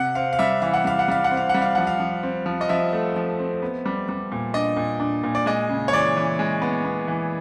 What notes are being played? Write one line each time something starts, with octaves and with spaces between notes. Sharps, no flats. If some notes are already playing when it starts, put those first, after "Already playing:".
Already playing: C3 F#5
C4 F5
F5
G3 E5
E3 F5
F#5
G3 F5
F#5
G3 F5
F#5
C4
F5
G3 F#5
F5
F3 F#5
F5
F3
C4
F3
D#5
F3 E5
A3
F3
C4
B3
G3
G3
A#2
D4 D#5
A#2
D4
A#2
D5
G#3 D#5
C#3
C#5
E3 D5
E3
G#3
B3
B3
E3